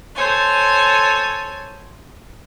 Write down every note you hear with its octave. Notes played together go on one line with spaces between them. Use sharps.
A4 C5 C#5 G#5